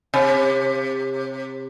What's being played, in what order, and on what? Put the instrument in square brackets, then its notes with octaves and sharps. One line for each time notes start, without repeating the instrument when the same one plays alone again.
[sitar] C3